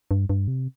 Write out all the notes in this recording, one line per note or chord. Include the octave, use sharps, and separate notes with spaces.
G2
G2
C3